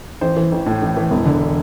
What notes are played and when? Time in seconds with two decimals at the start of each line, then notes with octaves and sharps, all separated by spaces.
0.21 A1 C5
0.36 E3
0.52 A1
0.66 A2
0.82 A1
0.97 E3
1.11 E1
1.26 D3